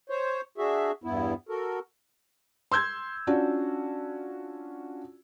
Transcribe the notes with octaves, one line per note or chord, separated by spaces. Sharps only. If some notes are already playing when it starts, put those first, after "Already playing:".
C5 C#5
D4 F#4 G#4 E5
E2 G2 B3 E4
F#4 A4 A#4
C6 E6 G6 G#6
C#4 D4 F4 F#4